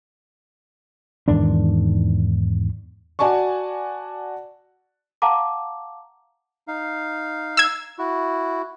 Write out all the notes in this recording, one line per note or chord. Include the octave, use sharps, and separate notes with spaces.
E2 G#2 D#3 D4
F#4 D5 G#5 A5 C#6
F5 F#5 A5 A#5 D6
D#4 F5
E6 G#6
E4 F#4